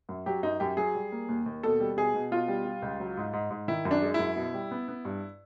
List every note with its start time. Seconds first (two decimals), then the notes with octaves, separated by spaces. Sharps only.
0.09 F#2
0.26 F#3 G4
0.43 F#2 D#4
0.60 F#2 G4
0.77 F#3 G#4
0.95 G3
1.12 A#3
1.29 D#2
1.46 D#2
1.63 B2 A4
1.80 G3
1.97 B2 G#4
2.14 B2
2.31 B2 F4
2.48 G3
2.65 G3
2.82 C#2
3.00 F#3
3.17 G#2
3.33 G#2
3.50 G#2
3.68 D#3 E4
3.85 F#2
3.91 D4
4.02 G#3
4.14 F#2 E4
4.36 B2
4.54 G3
4.71 B3
4.88 B3
5.05 G2